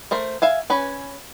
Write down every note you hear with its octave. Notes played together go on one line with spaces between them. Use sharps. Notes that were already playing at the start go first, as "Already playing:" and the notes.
A3 A#4 C5
E5 F5 G#5
C#4 B4 G#5